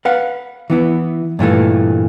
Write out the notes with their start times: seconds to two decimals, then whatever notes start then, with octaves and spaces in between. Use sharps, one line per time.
0.05 B4 F5 F#5
0.70 E3 B3 E4
1.39 G2 A#2 E3 A3